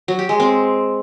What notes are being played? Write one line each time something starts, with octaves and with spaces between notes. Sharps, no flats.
F#3
G4
G#3
C4